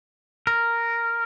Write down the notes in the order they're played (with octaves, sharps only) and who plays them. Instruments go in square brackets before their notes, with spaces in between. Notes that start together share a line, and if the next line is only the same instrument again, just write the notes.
[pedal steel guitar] A#4